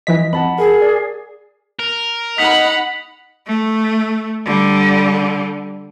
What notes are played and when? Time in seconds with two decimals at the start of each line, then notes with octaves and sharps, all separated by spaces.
0.07 E3 F3 D#5 B6
0.33 F2 F#5 A5 B5
0.58 G#4 A#4
0.82 D5
1.79 A#4
2.38 D#4 D#5 F#5 B5 B6 F7
3.47 A3
4.45 D3 G3